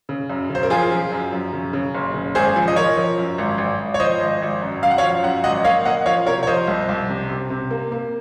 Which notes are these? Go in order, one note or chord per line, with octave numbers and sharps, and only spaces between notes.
C#3
F#2
C#3
C5
A#4
F3 F4 G#4
F3
F#2
F#2
C#3
C#3
F#1
C#3
G#1 G#4 C5
F3
D#5
F3 A#4 C#5
F3
F#2
G#1
G#1
G#1
C#5
F3 C5 D#5
G#1
G#1
F#2
F#2 F5
F#5
C#5 F5
F3
F#2 F#5
G#1 D#5 F#5
A#3 C#5 F5
A#3 D#5 F#5
F3 C#5 F5
C3 A#4 C#5
C#5
F3 C5 D#5
C2
C2
C3
C3
C3
A#3
A#3